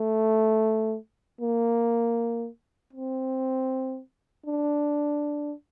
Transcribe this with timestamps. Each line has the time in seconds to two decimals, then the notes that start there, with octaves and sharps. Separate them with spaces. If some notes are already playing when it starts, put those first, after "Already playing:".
Already playing: A3
1.41 A#3
2.93 C4
4.46 D4